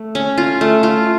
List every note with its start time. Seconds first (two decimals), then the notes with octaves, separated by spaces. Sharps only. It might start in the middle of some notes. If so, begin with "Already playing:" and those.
Already playing: A3
0.15 C#4
0.38 F4
0.61 A3
0.83 F4